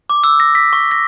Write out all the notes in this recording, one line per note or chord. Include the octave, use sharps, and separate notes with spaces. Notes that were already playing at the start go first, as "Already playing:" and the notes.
D6
E6
A#6
B6
C#6
A#6